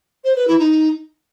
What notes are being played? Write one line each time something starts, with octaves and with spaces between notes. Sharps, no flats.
C5
B4
E4
D#4